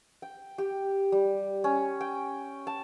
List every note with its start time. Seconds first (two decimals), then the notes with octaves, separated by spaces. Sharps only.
0.22 G5
0.58 G4
1.12 G3
1.64 C#4
2.01 G5
2.67 A5